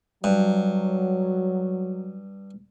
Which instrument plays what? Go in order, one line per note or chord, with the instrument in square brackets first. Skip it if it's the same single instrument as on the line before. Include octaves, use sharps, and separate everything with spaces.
[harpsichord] G2 [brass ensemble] F#3